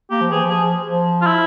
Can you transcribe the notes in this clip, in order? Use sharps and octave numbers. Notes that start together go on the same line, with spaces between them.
A#3 G4
F3
E3 G#4
F3
G#4
F3
F4
E4